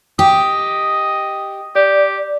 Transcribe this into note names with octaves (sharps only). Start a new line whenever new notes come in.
G4 D#5
G4 D5